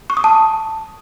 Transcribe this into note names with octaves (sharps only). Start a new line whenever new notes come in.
C#6
D#6
A5